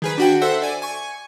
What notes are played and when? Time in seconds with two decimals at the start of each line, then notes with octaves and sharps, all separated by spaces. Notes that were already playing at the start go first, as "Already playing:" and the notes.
0.02 D#3 G#4 B4
0.18 D4 F#4 G5
0.41 A4 C5 E5 F#5
0.62 D5 G#5
0.82 G#5 C#6